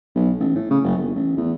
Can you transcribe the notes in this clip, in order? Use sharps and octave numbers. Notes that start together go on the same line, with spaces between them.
B1
A1
A2
C#3
F#1
G1
A1
E2